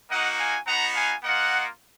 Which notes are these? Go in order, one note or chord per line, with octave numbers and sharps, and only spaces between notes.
A#3 D#4 F#4 D#5 F#5
F5 G#5
B3 D#4 F#4 F#5 A#5
F5 G#5
A#3 F4 D#5 F#5